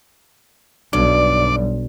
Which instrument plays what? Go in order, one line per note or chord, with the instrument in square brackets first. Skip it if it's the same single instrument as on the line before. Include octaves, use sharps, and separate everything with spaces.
[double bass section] B1 [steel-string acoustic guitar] G2 [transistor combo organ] D5